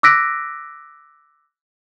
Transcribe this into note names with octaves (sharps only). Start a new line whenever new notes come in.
D6 E6 F#6 A#6 B6 D7